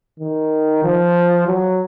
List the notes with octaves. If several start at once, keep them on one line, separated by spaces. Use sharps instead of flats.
D#3
F3
F#3